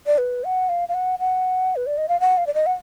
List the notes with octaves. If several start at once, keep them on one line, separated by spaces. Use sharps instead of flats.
D5
B4
F#5
F5
F5
F#5
F#5
B4
D5
D#5
F5
F#5
F5
D5
D#5
F#5